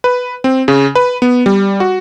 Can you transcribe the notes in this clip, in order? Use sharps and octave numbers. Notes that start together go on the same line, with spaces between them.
B4
C4
C#3
B4
B3
G3
F#4